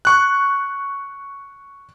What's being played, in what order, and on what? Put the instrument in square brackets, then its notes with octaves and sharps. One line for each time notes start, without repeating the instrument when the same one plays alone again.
[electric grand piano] C#6 F#6